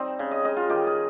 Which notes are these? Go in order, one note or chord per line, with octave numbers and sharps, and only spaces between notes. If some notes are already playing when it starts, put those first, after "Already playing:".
Already playing: G3 C4 D#4
C#3
D#5
C#3 D#5
F4
D#3 G4
G#4